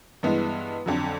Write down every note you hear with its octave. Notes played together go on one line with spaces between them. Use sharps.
G2 E3 G#3 B3
F2 D3 F#3